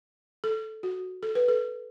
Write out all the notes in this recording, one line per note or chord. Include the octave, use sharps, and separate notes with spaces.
A4
F#4
A4
B4
A4